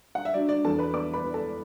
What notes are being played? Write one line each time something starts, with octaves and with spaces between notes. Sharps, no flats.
F#5
E5
F#3 D4 D5
D4 D5
E2 A4 A5
B4 B5
B3 D5 D6
B4 B5
B3
A4 A5